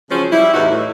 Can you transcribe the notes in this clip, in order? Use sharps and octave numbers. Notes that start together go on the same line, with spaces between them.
C#3 F3 F#3 G#3 C#4
G3 E4
E2 A2 E3 D#4 F#4
A2